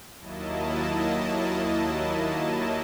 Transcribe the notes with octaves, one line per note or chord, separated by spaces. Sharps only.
D#2 F#3 A#3 E4 D#5 A5